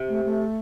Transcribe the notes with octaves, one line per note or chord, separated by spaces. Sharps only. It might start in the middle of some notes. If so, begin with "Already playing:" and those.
Already playing: C3
A3
A3